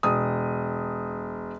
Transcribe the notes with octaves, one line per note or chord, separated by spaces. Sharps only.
E1 D#6